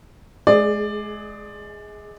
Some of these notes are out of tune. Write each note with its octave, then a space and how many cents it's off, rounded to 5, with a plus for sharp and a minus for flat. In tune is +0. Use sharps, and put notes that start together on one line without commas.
G#3 +30 G#4 +0 D5 +15